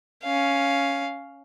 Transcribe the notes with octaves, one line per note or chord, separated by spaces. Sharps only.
C#4 F5